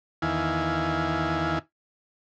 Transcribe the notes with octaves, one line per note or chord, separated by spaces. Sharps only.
E2 D#3 E4 F5 G#5